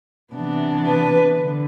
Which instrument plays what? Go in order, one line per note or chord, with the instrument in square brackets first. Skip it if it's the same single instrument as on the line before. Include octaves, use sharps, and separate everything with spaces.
[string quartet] C3 E3 B3 D4
B4
D3